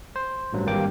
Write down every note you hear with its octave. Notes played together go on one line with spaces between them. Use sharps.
C5
A1 G2 F#3
G#1 G2 A#3 G5 D6